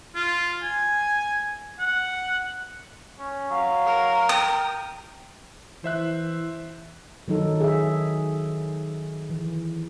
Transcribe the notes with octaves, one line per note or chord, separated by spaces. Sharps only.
F4
G#5
F#5
C#4
F#3 F5
A#4
G5 D#6
E3 C5 E5 F#6
D#3 F#3 D#4 A4
G#4 E5
E3